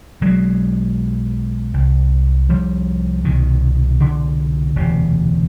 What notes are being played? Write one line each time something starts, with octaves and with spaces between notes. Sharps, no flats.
B1 B2 F#3 G#3
C2 C3
F3 G3
C2 B2 D#3
D3
E1 D2 C3